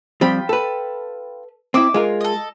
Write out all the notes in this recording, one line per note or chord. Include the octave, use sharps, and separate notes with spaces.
F3 G3 C4 F4 G5 B5
A4 B4
C4 D#4 E4 D6 E6
G#3 F4 A#4
A4 D#5